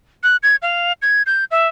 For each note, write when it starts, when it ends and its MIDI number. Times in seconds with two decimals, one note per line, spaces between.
0.23 0.37 90
0.43 0.56 92
0.62 0.93 77
1.02 1.23 92
1.26 1.45 91
1.51 1.68 76